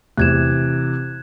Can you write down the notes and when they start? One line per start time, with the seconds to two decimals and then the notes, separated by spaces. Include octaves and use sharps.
0.17 E2 C3 E3 A3 F#6 G#6 E7